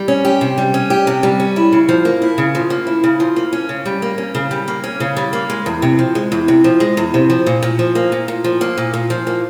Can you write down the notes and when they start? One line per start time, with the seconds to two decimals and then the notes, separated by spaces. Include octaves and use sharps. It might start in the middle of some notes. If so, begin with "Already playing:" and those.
Already playing: G3
0.08 C#4
0.25 G4
0.41 C3
0.58 G3
0.74 C#4
0.90 G4
1.07 C3
1.23 G3
1.40 C#4
1.56 E4
1.73 C#3
1.89 F3
2.05 A#3
2.22 E4
2.38 C#3
2.55 F3
2.70 A#3
2.87 E4
3.04 C#3
3.20 F3
3.36 A#3
3.53 C#4
3.69 C#3
3.86 G3
4.02 A#3
4.18 C#4
4.35 C#3
4.51 G3
4.68 A#3
4.84 C#4
5.00 C#3
5.17 G3
5.33 A#3
5.50 G#3
5.66 E2
5.82 C3
5.99 F3
6.15 G#3
6.32 E2
6.48 C3
6.64 F3
6.80 G#3
6.97 E2
7.14 C3
7.30 F3
7.46 A#2
7.63 A#2
7.79 F3
7.95 A#3
8.12 A#2
8.28 A#2
8.44 F3
8.61 A#3
8.78 A#2
8.94 A#2
9.10 F3
9.27 A#3